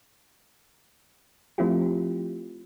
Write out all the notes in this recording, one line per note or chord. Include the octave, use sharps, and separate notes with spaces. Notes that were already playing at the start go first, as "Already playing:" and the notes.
F3 A3 C4 E4 F4 G4